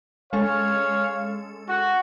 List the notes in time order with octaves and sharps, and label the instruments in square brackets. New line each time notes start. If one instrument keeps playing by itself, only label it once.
[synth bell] G#3 C#4 A4 [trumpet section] C#5 F5
[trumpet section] F#4